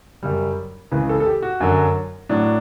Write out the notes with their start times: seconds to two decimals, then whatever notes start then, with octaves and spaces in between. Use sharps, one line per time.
0.23 F#2 C#3 G3
0.92 C#2 C#3 E3 B4
1.09 A4
1.20 A4
1.26 G4
1.43 F#4
1.60 F#2 D3 F#3
2.29 A2 F#3 D4